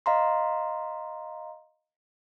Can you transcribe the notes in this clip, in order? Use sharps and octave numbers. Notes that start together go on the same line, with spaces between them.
D#5 F5 A#5 C6